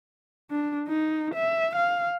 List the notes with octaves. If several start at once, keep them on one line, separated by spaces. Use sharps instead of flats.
D4
D#4
E5
F5